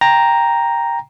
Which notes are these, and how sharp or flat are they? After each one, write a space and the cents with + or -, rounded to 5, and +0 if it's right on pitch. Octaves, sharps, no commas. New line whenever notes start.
G5 +10 A#5 +0